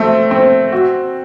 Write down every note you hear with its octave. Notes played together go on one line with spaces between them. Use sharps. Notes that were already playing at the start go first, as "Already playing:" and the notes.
Already playing: A3 C4
C4
F#4